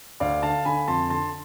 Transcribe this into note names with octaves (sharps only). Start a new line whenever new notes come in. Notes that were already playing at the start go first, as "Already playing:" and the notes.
D2 D5 F5
D3 F5 A5
D3 G#5 B5
F2 A5 C6
D3 A5 C6